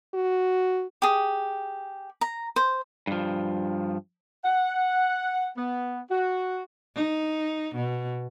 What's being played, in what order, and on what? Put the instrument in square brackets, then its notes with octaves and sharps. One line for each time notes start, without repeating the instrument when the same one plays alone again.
[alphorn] F#4
[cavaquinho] G4 G#4
A#5
C5
[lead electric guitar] G2 F3
[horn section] F#5
B3
F#4
[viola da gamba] D#4
B2